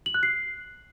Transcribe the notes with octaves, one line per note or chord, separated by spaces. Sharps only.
F#7
F#6
C7